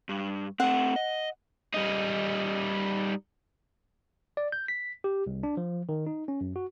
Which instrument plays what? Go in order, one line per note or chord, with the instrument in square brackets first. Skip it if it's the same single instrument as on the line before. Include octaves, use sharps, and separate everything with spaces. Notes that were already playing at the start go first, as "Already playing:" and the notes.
[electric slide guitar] G2
[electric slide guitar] A3 C4 [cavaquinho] F#5
[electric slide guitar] D#5
[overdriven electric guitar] G3 D#4
[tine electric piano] D5
G6
B6
G4
C2
D4
F3
D#3
D#4
C#4
F#2
F#4